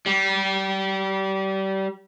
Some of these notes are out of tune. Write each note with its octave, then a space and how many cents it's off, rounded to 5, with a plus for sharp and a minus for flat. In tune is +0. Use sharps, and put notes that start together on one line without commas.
G3 -25